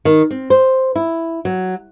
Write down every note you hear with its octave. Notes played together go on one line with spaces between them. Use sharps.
D#3
C4
C5
E4
F#3